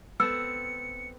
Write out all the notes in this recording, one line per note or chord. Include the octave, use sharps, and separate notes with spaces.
B3 C4 A4 E6 C#7